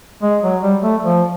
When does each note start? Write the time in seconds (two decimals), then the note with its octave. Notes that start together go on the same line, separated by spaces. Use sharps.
0.22 G#3
0.43 F#3
0.63 G3
0.82 A3
1.03 F3